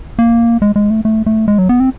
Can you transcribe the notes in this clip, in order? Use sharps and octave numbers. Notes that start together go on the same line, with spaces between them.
A#3
G#3
G#3
A3
A3
A3
G#3
F#3
B3
C4